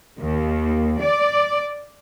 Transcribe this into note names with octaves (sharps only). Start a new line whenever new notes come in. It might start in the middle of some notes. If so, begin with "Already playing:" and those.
D#2
D5